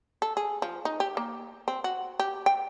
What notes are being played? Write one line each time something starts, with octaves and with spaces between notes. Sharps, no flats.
A4
G#4
F3
D#4
G4
A#3
C4
F#4
G4
G5